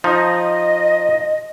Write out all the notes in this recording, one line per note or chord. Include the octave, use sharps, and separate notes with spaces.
F3 D#4 D#5